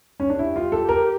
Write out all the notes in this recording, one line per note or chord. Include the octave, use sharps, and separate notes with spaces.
C#4
D4
E4 G4
F4
A4
A#4